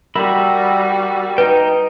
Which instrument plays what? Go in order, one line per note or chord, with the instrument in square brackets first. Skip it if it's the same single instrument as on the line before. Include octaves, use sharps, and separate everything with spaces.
[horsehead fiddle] G3 F#4 [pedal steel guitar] A#4 E5 B5
[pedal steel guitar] D#4 G5 [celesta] B4